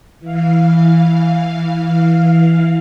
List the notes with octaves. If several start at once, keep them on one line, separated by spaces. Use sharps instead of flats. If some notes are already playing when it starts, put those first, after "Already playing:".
E3 F5